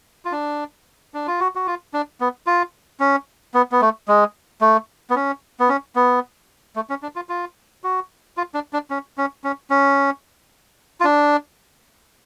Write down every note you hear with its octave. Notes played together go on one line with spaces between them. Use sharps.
F4
D4
D4
F4
F#4
F#4
F4
D4
B3
F4
C#4
B3
B3
A3
G#3
A3
B3
C#4
B3
C#4
B3
A3
C#4
D4
F4
F4
F#4
F4
D4
D4
C#4
C#4
C#4
C#4
F4
D4